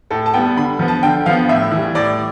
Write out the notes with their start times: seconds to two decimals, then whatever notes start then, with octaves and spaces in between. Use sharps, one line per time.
0.11 A2 A4
0.26 A5
0.34 G3 B3 G5
0.56 D3 B5
0.79 F3 B3
0.88 A5
1.03 D3 G5
1.26 F3 B3 F5
1.49 A2 E5
1.71 E3 G3
1.95 A2 D5